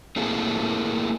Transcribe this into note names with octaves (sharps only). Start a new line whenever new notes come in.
A3 A#3 C4 E4 G#4 A4